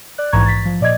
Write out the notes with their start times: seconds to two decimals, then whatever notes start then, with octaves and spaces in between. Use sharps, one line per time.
0.18 D5 F#6
0.32 A#1 G#2 E3 A#5 C#6 G#6
0.46 A6 B6
0.65 F3
0.81 A#2 D5 D#5 G#6